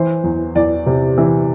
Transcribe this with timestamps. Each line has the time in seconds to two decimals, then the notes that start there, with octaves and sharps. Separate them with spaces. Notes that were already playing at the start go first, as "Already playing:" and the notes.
Already playing: E3 C5
0.24 E2
0.55 E2 D5
0.86 C3
1.18 E3